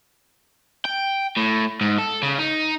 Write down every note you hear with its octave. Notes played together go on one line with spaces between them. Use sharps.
G5
A2
G#2
A4
C#3
D#4